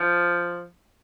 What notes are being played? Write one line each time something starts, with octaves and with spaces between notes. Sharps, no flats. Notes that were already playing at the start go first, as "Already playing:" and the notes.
Already playing: F3